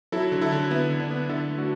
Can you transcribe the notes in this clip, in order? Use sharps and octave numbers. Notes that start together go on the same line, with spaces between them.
F#3 E4 A4
D3
E4 A4
D3
B3 E4
D3
D4
B3
D3 E4 A4
A3
D4 F#4